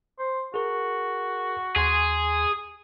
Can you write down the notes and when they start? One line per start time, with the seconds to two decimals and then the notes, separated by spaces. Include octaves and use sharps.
0.19 C5
0.54 F#4 G#4 A#4
1.76 D#2 G#4 C6